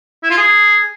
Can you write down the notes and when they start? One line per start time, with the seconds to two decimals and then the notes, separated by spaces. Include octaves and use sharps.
0.23 E4
0.30 F4
0.38 G#4